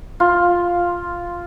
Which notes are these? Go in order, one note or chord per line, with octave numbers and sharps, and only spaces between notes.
F4